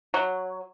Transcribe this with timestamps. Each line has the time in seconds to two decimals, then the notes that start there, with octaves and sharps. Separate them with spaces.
0.14 F#3